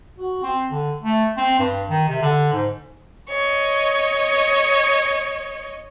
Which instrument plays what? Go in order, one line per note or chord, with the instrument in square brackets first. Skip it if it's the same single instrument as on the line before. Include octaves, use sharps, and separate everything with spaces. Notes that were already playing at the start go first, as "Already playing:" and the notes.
[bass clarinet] F#4
C4
D3
A3
C4
G2
D#3
C3
D3
G#2
[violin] C#5 D#5